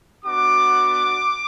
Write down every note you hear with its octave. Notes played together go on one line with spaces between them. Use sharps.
B3 D4 F#4 D6